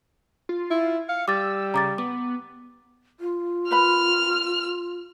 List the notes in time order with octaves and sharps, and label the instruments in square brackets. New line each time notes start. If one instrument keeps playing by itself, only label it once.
[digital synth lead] F4
[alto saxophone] E4
[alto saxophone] F5 [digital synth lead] C#7
[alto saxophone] G3 [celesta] D6 A6 [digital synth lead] E6
[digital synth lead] C#3 [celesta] A#5 D6 A6
[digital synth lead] B3 [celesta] D6
[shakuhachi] F4
[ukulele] A#4 B4 B5 [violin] F6